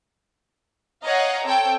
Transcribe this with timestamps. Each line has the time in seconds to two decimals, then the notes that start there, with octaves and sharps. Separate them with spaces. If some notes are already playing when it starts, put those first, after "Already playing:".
1.04 C#5 D#5 F5 F#5 A#5
1.46 C4 A4 C#5 G5